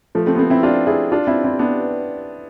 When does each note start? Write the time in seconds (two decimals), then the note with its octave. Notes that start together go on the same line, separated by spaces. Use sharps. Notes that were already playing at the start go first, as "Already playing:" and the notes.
0.15 F3 A3
0.26 A3 C4
0.35 B3
0.39 A3 C4
0.50 C4 E4
0.63 D4 F4
0.87 E4 G#4
1.12 D4 F4
1.27 C4 E4
1.44 C4 E4
1.59 B3 D4